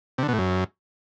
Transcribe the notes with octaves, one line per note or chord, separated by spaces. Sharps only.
C3
D3
B2
A2
F#2